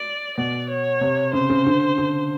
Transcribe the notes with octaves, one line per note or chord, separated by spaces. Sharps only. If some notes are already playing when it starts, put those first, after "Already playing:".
Already playing: D5
B2 D5
C#5
C3
C#3 C5
C#3
D3
D3